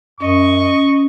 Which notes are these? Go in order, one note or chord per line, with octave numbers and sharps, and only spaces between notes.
F#2 C#4 D#5 C#6